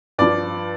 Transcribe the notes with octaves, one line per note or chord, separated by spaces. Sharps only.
G2 F3 D5